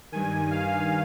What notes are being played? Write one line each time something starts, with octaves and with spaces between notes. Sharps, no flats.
G2 D#3 G#5
F5